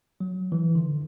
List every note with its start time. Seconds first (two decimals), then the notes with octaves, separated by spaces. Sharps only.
0.20 F#3
0.52 E3
0.75 D3